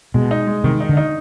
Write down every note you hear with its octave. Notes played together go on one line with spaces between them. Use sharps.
B2 G#3
D#4
G#3
C3 D#3
D#4
D3
D#4